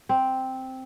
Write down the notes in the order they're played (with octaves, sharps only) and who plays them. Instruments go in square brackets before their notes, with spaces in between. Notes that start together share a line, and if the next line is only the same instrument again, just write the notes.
[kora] C4